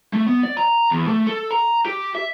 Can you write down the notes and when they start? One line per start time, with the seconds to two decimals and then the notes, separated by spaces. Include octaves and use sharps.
0.13 A3
0.26 B3
0.43 D5
0.57 A#5
0.91 E2
1.08 A3
1.27 A4
1.51 A#5
1.85 G4
2.15 E5